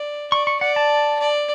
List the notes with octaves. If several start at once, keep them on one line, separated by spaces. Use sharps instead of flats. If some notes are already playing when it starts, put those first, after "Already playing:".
Already playing: D5
D5 C#6
C#6
D5 F#5
A5
D5